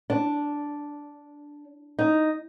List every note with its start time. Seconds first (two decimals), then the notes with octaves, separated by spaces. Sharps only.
0.10 D4
1.99 D#4